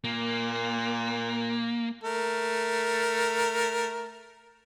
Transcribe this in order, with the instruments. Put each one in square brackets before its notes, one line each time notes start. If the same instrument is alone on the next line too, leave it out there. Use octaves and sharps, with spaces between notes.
[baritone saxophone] A#2 [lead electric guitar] A#3
[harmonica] A3 A#4